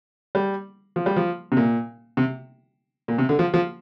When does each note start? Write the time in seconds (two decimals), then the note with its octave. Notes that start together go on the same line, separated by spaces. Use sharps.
0.35 G3
0.96 F3
1.06 G3
1.16 F3
1.52 C3
1.57 A#2
2.17 C3
3.08 A#2
3.18 C3
3.29 D3
3.39 F3
3.54 F3